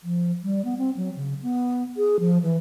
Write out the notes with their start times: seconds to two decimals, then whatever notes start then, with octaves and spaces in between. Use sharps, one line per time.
0.04 F3
0.43 G3
0.65 B3
0.78 C4
0.97 F#3
1.16 C#3
1.42 B3
1.97 G#4
2.20 F3
2.42 E3